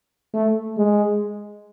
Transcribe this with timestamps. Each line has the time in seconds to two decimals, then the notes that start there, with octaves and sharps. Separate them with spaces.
0.34 A3
0.77 G#3